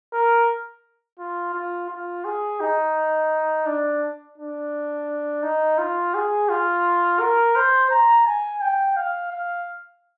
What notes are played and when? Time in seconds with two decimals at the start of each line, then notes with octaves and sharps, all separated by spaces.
0.13 A#4
1.19 F4
1.54 F4
1.90 F4
2.25 G#4
2.61 D#4
3.66 D4
4.38 D4
5.43 D#4
5.78 F4
6.14 G#4
6.49 F4
7.20 A#4
7.56 C5
7.90 A#5
8.27 G#5
8.61 G5
8.97 F5
9.33 F5